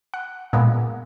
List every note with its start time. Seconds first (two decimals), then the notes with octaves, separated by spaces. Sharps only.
0.14 F#5
0.53 A#2 G#3 B3